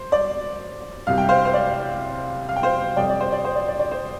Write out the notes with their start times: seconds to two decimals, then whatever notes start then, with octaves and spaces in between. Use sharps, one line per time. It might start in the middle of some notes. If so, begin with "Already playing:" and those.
Already playing: C5
0.12 D5
1.07 C2 C3 G3 F5
1.18 G5
1.29 C5 F5
1.45 C5
1.54 D5
2.49 F5
2.56 G5
2.63 C5 F5
2.96 F2 C3 G3 D5 G5
3.09 D5
3.20 C5
3.32 D5
3.45 C5
3.55 D5
3.68 D5
3.80 D5
3.91 C5